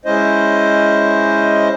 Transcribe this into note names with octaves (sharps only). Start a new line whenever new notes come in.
G#3 C#4 E4 C5 D#5